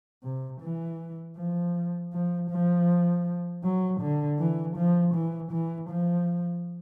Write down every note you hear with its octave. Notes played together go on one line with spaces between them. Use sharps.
C3
E3
F3
F3
F3
F#3
D3
E3
F3
E3
E3
F3